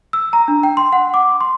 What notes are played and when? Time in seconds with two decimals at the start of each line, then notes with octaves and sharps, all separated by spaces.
0.13 E6
0.33 A#5
0.48 D4
0.63 G5
0.77 C6
0.93 F#5
1.14 D6
1.41 C6